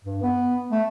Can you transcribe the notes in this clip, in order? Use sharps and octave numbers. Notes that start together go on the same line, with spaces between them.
G2
B3
A3